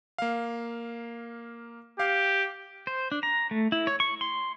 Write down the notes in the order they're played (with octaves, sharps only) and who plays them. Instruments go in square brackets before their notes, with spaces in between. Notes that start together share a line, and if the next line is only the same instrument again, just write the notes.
[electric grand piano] A#3 F5
[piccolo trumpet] G4 [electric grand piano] F5
[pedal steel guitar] C5
D4
A#5
A3
E4
C#5
C#6
C6